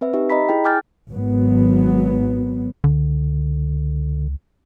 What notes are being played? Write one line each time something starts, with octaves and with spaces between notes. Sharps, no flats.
C4 B4 E5
D#4 G4 E5
D#5 A#5 B5 B6
E4 G#4 G5
G5 G#5 D6 F6 G6 A6
G#1 F#3 B3
C#2 D3